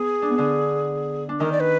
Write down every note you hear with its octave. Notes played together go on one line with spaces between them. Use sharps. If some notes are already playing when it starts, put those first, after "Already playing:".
Already playing: B3 G#4
D4
B3
D3 D4
D4
D#3 D#4 A#4
D5
B4